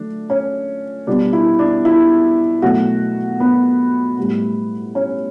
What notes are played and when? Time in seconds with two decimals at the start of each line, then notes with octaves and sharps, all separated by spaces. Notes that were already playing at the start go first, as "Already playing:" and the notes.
Already playing: D3 F#3 A3 D4
0.30 C#4
1.07 B2 G3 B3 D4
1.33 E4
1.59 D4
1.85 E4
2.62 B2 F#3 A3 F#4
3.40 B3
4.18 A2 G3 B3
4.95 C#4